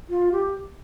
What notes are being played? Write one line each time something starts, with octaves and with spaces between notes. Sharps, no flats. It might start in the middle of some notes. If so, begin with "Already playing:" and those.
F4
G4